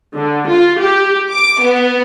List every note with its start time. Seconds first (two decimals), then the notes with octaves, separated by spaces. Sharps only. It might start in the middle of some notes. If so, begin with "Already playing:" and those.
0.16 D3
0.49 F4
0.81 G4
1.32 D6
1.62 B3